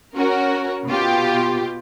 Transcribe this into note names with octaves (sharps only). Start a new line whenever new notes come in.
C#4 F#4 A#4
B2 F4 G4